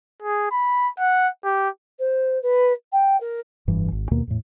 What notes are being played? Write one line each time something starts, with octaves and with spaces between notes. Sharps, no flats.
G#4
B5
F#5
G4
C5
B4
G5
A#4
F1 G2 E3
G#1
D#2 B2 A#3
E2 A2